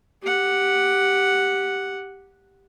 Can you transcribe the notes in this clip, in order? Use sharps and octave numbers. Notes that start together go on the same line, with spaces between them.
G4 F#5